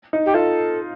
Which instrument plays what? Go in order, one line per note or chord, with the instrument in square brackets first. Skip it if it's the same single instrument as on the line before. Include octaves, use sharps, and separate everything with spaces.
[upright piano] D#4
[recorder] G4
[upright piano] F4 [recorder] A4